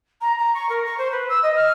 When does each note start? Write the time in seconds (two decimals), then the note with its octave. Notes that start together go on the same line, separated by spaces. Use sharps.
0.21 A#5
0.38 A#5
0.54 C#6
0.69 A#4
0.85 C#6
0.98 C5
1.11 B4
1.29 E6
1.43 D#5
1.56 F6